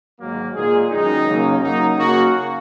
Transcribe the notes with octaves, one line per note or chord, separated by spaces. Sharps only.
G#2 D#3 F#3 A#3
A#2 G#3 G#4
F#2 D#3 G#3 D#4
C#3 F#3 A#3
F#2 F#3 A#3 D#4
C#3 A#3 F#4